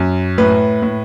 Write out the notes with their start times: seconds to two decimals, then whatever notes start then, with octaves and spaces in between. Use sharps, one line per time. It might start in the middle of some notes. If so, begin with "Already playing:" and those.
Already playing: F#2
0.38 A2 B4
0.82 A2